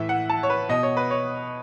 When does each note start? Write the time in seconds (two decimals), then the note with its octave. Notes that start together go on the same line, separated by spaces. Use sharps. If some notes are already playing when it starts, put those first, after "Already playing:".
Already playing: A2 E3 E5
0.09 F#5
0.29 A5
0.43 C#5
0.50 B4
0.69 B2 D#5
0.83 C#5
0.97 B4
1.11 C#5